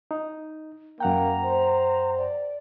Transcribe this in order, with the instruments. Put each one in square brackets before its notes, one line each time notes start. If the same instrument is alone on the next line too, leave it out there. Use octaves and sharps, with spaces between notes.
[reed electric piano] D#4
[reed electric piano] F#2 F#5 G5 [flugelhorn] A#3 [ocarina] A#5
[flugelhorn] C5
[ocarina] D5